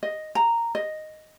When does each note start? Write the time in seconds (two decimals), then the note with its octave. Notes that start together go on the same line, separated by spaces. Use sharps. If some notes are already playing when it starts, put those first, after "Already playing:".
0.03 D#5
0.35 A#5
0.75 D#5